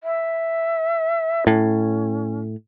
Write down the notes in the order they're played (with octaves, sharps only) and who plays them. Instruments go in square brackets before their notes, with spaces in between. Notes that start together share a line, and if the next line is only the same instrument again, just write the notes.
[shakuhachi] E5
[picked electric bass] A2 [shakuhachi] C#4